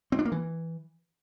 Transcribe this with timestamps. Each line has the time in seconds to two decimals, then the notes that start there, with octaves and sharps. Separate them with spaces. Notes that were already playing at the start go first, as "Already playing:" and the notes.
0.12 C4
0.19 D4
0.25 A#3
0.32 E3